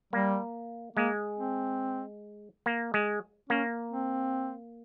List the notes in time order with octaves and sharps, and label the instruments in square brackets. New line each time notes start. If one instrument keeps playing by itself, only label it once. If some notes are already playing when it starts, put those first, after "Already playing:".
[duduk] G3 [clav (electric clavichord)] A#3
[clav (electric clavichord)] G#3 [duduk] A#3
[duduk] C4
[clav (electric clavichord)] A#3
G#3
[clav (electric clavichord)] A#3 [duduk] C#4
[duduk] C4